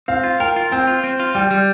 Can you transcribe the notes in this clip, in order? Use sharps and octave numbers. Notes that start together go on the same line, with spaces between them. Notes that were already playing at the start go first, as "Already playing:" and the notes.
C4 F5
F4
A#4 G5
F4
C4 G5
F4
C4
F4
G3 G5
G3